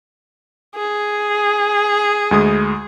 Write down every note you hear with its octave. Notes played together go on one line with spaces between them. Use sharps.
G#4
D2 G#3 D#6